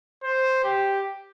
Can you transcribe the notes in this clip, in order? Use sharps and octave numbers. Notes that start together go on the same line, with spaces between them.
C5
G4